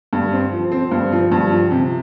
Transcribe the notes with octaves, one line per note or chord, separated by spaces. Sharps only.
G2
C4
F3
C4
G2
F3
G2
F3
C3